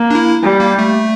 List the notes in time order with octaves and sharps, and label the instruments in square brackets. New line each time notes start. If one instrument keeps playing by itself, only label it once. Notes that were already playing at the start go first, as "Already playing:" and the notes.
Already playing: [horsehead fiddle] A#3
[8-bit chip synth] D4
E4
[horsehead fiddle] G3
[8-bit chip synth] A#3
A3